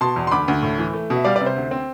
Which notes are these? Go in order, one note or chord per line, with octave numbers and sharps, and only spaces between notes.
B2 A5 C6
E2
C6
D2 B5 D6
D2
A2
E3
A3
B2
E5
G3 D5 F5
B4 D5
C3
C5
D2
C4